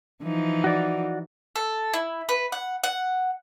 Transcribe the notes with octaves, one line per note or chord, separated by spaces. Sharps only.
E3 F3 D#4
F#4 D5
A4
E4
B4
F#5
F#5